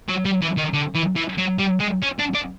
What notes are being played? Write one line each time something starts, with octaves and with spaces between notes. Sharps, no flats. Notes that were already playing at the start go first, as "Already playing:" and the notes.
F#3
G3
E3
D#3
D3
E3
E3
F#3
G3
G#3
C#4
D4
D4